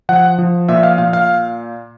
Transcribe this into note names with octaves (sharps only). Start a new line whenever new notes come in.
F3 F#5
F3
A#2 E5
F5
A#2 F5
F5